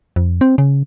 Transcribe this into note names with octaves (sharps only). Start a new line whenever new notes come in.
F2
C4
C#3